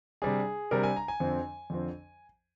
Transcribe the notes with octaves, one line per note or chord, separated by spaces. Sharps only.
C3 G3 D4 G#4
C3 G3 D4 A#4
G#5
A#5
G#5
F2 D3 F3 C4
F2 D3 F3 C4